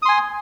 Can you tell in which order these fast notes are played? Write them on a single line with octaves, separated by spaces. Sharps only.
D#6 C6 G#5